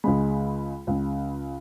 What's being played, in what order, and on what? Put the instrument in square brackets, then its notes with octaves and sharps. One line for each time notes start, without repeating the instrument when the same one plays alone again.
[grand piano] C#2 C#3 G#3 B5
C#2 C#3 G#3